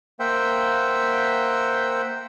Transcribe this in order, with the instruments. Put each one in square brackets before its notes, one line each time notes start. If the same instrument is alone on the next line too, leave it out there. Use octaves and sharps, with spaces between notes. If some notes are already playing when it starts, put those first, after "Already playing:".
[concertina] A#3 C5 E5 F#5 G5